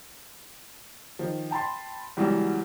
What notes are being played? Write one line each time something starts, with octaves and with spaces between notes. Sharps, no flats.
D#3 F3
G5 A5 B5 C6
C#2 E3 F#3 G3 B3